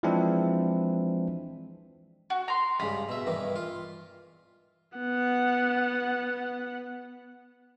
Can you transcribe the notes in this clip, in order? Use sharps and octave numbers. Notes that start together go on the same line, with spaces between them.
E3 F3 G#3 C4 D4 E4
F#4
A#5 C6
G2 C#3 G#3 B5
B2 E5
G2 D#3 E3
F4
B3 F#5